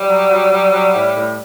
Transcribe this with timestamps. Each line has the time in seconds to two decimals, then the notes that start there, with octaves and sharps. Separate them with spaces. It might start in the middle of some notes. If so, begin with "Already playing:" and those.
Already playing: G3
0.08 F#3
0.30 F#3
0.52 F#3
0.73 F#3
0.95 A2
1.16 A2